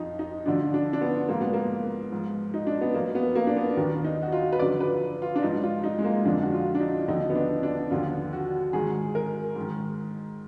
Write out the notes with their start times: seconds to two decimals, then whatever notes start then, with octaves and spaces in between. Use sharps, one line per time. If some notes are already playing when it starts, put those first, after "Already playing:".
Already playing: F2 F3 D#4
0.19 D#4
0.46 D2 D3 F3 D4
0.74 D4
0.93 D4
1.01 B3
1.29 G#2 F3 A#3
1.41 B3
1.53 A#3
2.12 G#2 F3
2.54 D#4
2.67 D4
2.81 B3
2.94 F#2 F3 A#3
3.15 B3
3.35 A#3
3.47 D4
3.57 B3
3.77 D#2 D#3 D4
4.05 D#4
4.22 F#4
4.32 F4
4.53 B4
4.59 F#2 D3 F3 D5
4.80 B4
5.22 F4
5.36 D4
5.42 G#2 F3 D#4
5.63 F4
5.84 D#4
5.99 G#3
6.04 A#3
6.25 F2 D3 F3 D4
6.42 F#4
6.53 F4
6.75 D4
6.80 D#4
7.08 D#2 D3 F3 D#4
7.30 B3
7.35 D4
7.63 D4
7.91 D#2 D3 F3 F4
8.33 F#4
8.73 G#2 D#3 G#4
9.15 A#4
9.56 G#2
9.61 D#3